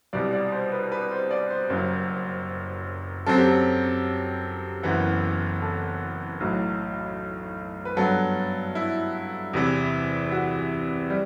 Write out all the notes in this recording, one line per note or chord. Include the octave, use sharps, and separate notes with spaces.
C2 B2 G3 D5
D5
C5
B4
B4
C5
D5
C5
F#1 F#2 F#3
F#2 F#3 C4 A4
G4
A4
F#1 F#2 E3 B3
A4
B1 A2 F#3
B4
G2 F#3 B3 A4
E4
E2 C3 E3
F#4
G3